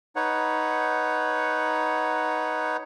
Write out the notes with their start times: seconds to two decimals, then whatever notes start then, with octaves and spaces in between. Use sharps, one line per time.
0.16 D#4 B4 C#5 F#5